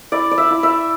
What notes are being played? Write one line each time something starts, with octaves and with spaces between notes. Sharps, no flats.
E4 D5
D5
E5
E4
E5